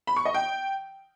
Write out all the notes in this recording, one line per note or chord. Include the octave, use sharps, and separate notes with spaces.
B5
C#6
D#5
G5